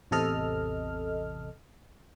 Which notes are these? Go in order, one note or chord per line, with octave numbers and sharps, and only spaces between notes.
A1 E2 C3 A4 D#5 F6